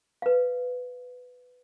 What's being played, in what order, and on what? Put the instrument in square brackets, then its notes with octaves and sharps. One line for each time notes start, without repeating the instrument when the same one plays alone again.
[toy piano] B4 F5